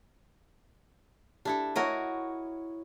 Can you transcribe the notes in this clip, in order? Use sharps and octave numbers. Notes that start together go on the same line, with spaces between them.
D4 E4 G4 A4
E4 F#4 A#4 C#5 D#5 F#5